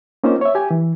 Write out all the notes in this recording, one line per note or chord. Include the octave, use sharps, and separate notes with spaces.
A#3 C4 C#4 D#4 F4 C5
C#5 E5
G4 G#5
E3